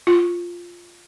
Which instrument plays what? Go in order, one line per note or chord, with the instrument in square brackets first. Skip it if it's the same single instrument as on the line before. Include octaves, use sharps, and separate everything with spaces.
[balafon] F4